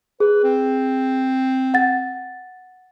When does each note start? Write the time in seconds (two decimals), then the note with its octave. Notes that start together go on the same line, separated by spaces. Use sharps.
0.20 G#4 B4
0.44 C4
1.74 F#5 A6